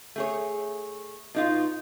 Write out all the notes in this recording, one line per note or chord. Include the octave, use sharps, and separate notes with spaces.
A3 G#4 C#5
B2 D#4 F4